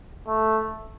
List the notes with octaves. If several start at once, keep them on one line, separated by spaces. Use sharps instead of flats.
A3